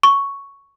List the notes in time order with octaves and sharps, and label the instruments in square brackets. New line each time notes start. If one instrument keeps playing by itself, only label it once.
[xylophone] C#6